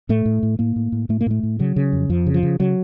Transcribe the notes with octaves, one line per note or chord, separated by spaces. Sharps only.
A2 A3
A2
A2
A2 A#3
A2
A2
A2 A3
A#3
A2 A3
A2
C#3 F#3
C#3
F2
F2 F3
C#3
F3
C#3
C#3 F#3